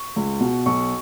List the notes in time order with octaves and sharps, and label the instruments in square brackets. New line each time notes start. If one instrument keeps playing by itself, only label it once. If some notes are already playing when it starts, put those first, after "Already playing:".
Already playing: [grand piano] C#6
C#2
B2
B1 C#6